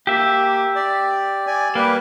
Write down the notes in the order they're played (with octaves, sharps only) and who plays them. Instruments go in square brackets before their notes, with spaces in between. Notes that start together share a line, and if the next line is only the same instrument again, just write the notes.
[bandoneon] A#3 [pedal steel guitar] G4 E5
[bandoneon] D5
D5 G#5
[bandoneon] G3 G4 B4 [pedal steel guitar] A#3